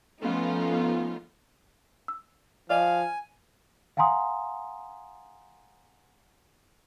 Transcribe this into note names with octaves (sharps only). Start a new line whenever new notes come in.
F3 A3 B3 C#4 D#4 F4
E6
F3 D5 D#5 F5 G#5
F5 F#5 G#5 A#5 C6 D#6